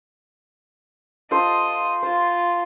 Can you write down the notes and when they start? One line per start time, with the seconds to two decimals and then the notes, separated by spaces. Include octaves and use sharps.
1.31 F4 A4 C5 D#5
2.02 F4 C5